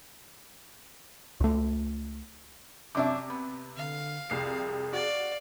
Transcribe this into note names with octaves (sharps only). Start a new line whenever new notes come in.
C#2 A3
F#2 C3 D4 E5 D6
B3
D3 F5
C2 F2 G#4 C7
F#4 D5 F5